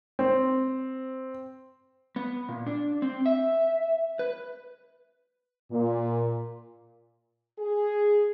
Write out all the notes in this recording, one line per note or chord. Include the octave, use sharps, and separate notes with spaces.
C4
B3
A#2
D4
C4
E5
B4
A#2
G#4